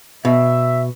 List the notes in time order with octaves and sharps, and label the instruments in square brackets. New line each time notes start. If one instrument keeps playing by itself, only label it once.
[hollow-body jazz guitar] B2 [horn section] E5